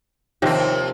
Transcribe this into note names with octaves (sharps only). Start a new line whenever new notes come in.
D#2 C3 D#3 F3 C4